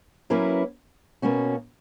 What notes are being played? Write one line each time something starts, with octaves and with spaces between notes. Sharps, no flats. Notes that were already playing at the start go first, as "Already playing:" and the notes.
F#3 A#3 C#4 E4 B4
B2 A#3 C#4 F#4